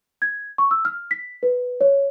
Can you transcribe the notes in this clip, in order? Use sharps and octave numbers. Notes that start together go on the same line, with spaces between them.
G#6
C#6
E6
F6
B6
B4
C#5